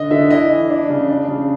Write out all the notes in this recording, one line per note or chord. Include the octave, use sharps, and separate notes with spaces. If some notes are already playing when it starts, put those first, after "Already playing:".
Already playing: D3 D#5
D3 E5
E4 D#5
E3
D4
C#3
D4
C#3